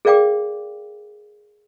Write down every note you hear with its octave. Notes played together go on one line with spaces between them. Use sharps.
G#4 A#4 D5 F5 G5 D6